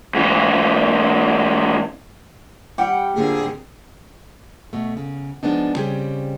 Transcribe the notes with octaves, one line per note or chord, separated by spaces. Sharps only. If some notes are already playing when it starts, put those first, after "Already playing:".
G#2 E3
G3 G4 F#5 G5
A#2 D3 C4 G#4
B2 A3
C#3
F3 G#3 B3 D4 D#4
C#3 G3 C4 G4 G#4